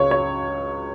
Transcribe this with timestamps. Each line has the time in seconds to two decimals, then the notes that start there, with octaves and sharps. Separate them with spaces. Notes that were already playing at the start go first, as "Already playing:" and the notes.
Already playing: C#2 C#3 C#5
0.11 C#5